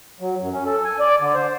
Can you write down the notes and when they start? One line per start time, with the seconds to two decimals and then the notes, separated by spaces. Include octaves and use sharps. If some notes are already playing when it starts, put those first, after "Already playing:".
0.20 F#3
0.40 F#2
0.53 C#4
0.66 A4
0.85 G#5
0.99 D5
1.20 D3
1.35 C5